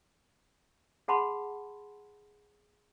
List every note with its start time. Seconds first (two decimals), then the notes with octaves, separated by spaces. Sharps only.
1.08 G#4 F#5 A5 B5 C6